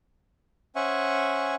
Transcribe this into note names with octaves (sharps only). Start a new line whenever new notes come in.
C#4 C5 E5 F#5 G#5 C#6